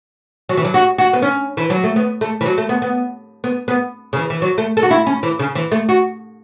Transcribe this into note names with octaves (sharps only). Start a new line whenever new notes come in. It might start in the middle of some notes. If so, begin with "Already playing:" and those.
F#3
E3
F#3
F#4
F#4
B3
C#4
E3
F#3
A3
B3
A3
E3
F#3
A3
B3
B3
B3
B3
C#3
E3
E3
F#3
A3
A4
F#4
E4
C#4
E3
C#3
E3
A3
F#4